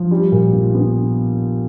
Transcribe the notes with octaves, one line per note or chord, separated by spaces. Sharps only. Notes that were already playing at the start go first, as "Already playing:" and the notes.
Already playing: F3
G3
A#2
A#1
B3